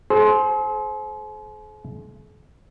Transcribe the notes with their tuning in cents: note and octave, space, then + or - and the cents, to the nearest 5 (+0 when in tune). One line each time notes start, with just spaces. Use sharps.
G#4 +45 C5 +0